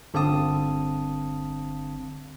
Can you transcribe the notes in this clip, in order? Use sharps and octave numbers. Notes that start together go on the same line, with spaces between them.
G1 D3 C4 F5 A5 D#6